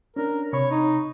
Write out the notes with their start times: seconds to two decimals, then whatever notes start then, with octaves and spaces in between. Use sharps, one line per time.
0.16 C#4 D4 A#4
0.53 C3 C#5 B5 C#6
0.71 D#4